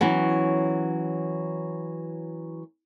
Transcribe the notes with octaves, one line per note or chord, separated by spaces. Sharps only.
E3 F#3 B3 C#4